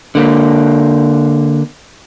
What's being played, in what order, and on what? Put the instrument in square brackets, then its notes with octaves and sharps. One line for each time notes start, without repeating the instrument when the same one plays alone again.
[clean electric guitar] D3 A#3